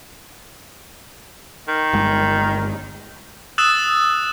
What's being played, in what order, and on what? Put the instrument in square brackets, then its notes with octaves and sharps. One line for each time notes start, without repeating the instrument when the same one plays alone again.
[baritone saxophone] D#3
[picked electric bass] G1 G#3
[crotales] D#6 E6 F#6 A6 E7